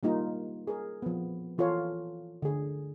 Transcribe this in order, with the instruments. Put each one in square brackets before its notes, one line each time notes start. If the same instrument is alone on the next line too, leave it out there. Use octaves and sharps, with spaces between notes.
[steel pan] G3 A#3 D#4 F4
G#4 A#4
F3 B3
E3 F4 A4 C#5
D3 G#4